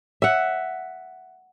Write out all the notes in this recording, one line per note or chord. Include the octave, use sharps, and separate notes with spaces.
E5 F#5